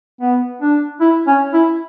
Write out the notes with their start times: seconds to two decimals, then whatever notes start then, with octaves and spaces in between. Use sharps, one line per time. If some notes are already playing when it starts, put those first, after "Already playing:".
0.21 B3
0.61 D4
1.00 E4
1.27 C#4
1.53 E4